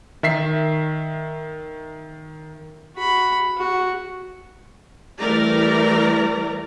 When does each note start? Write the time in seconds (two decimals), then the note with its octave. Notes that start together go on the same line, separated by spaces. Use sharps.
0.23 D#3 E5 B6 C7
2.96 F#4 B5
3.57 F#4
5.19 E3 G3 A3 A#4 D5 A#5